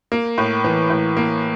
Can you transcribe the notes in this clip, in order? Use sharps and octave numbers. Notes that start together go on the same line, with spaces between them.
A#3
A2
E3
A2
A#3